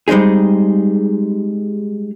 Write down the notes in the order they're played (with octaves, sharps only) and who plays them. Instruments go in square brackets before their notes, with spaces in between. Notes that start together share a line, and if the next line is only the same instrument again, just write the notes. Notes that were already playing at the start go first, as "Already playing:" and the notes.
[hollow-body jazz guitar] G3 G#3 C4 D#4 G#4